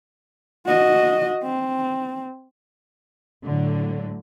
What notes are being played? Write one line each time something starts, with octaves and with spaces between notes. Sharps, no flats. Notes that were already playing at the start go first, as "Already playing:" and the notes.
F#4 D#5
C4
A2 D3 F#3